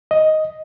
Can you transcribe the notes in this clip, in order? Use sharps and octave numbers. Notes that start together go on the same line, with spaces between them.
D#5